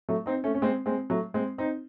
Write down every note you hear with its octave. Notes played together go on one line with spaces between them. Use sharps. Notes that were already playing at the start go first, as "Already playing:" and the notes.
F#3 A3
C4 D#4
A3 C#4
C#4
G#3 C4
G#3 C4
F#3 A3
G#3 C4
C4 D#4